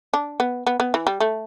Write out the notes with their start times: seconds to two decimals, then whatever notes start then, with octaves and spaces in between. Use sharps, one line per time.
0.14 D4
0.40 B3
0.67 B3
0.80 B3
0.94 E3
1.07 G3
1.20 A3